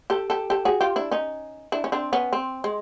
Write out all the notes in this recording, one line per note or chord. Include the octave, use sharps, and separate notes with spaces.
G4 A4
G4 A4
G4 A4
F#4 G#4
F4 G4
D4 E4
C#4 D#4
D4 E4
C#4
C4 D4
B3 C#4
C4
G#3